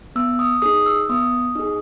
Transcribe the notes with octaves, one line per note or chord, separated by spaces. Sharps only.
B3 E6
D#6
D#4 G#4 D#6
E6
B3 D#6
D#4 G#4